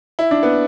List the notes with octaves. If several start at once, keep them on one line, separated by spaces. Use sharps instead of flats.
E4
D4
B3